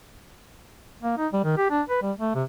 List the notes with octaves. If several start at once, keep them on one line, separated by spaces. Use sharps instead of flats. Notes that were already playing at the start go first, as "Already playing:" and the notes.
A#3
D#4
G3
D#3
G4
D4
B4
G3
A3
C3